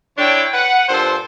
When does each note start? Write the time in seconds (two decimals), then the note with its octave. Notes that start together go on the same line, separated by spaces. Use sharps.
0.18 D3 D4 E4 C#5 G5
0.53 B4 F#5
0.89 G2 A#2 A4 C5